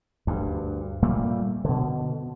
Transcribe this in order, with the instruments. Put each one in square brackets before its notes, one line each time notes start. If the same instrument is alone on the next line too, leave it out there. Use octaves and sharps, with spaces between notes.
[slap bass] D2 G2
A#2 G3 A3 A#3
B2 D3